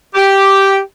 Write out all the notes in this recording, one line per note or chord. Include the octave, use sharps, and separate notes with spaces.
G4